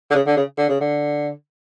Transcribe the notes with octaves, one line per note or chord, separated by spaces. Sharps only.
D3
C#3
D3
C#3
D3
C#3
D3